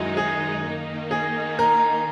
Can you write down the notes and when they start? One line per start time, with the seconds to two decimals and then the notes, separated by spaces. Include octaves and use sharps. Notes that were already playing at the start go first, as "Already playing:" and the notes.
Already playing: F#2 D#3 G#3 D#4 E4 F#4 G#4
0.17 G#4
0.64 D#3 A#3 D#4
1.11 G#4
1.59 A#4